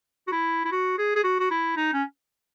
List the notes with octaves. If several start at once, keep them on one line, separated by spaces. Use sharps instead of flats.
F#4
E4
E4
F#4
G#4
G#4
F#4
F#4
E4
D#4
C#4